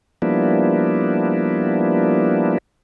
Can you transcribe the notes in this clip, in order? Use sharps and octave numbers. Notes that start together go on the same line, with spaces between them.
F3 G3 A#3 B3 D4 E4